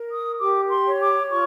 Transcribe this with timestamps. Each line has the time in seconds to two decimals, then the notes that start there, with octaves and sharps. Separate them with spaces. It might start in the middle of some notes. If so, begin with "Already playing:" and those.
Already playing: A#4
0.10 D#6
0.39 G4 D6
0.70 C6
0.86 C#5
1.01 D6
1.30 F4 C#6